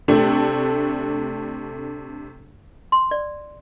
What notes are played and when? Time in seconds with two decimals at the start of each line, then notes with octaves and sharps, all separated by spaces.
0.08 C3 A3 D4
2.92 C6
3.11 D5